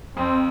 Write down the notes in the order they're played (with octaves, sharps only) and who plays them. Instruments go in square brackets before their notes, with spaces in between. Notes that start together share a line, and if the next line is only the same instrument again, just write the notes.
[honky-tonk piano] F2 [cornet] C4